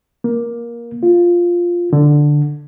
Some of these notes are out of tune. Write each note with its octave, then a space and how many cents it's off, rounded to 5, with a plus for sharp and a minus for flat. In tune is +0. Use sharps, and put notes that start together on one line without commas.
A#3 +15
F4 +0
D3 +5